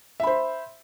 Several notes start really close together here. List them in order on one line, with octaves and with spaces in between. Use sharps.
E5 B5 C5